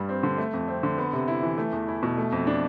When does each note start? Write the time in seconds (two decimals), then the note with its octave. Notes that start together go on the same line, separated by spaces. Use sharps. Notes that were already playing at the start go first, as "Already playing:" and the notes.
Already playing: G2 G3
0.09 C4
0.23 D3
0.38 A3
0.53 F2
0.68 C4
0.83 D3
0.98 B3
1.13 C3
1.28 E4
1.43 E3
1.58 A3
1.73 E2
1.88 E4
2.03 B2
2.18 A3
2.32 F2
2.47 D4